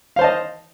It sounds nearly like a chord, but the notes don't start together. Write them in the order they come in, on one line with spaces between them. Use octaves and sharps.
F5 C5 A5 D#5